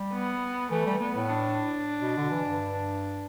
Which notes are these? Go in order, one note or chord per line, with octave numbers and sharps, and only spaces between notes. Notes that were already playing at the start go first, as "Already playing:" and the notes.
Already playing: G3
B3
E3 A3
G3
B3
A2
D4
B2
D3
E3
G2